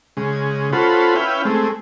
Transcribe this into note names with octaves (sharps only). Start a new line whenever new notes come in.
C#3 G#3
C#4 F4 F#4 A4 C5 B5
C#4 E4 B4 F5 G5
G#3 A3 C4